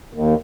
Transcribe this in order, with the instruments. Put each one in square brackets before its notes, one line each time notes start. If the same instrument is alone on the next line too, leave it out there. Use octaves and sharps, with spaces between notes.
[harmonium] D#2